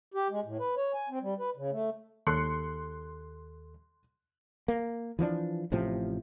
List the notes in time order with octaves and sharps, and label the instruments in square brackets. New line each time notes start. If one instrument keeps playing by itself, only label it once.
[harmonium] G4
G#3
A2
B4
C#5
G#5
C4
G3
B4
C#3
A3
[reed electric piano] D#2 A4 [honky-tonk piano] C6 F#6 C#7
[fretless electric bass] A#3
E3 F3 A3 D4
A1 A2 C3 F3